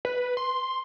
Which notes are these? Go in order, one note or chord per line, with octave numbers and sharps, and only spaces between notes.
B4
C6